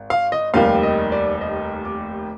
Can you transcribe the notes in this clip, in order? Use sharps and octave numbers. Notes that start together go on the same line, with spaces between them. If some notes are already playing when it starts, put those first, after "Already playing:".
Already playing: G#1
F5
D#5
F1 D#2 D#3 G3 F5
D#5
D5
D#5
D6